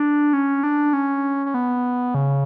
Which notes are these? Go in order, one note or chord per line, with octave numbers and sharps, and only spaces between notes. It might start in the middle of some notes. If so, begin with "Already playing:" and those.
Already playing: D4
C#4
D4
C#4
C#4
B3
C#3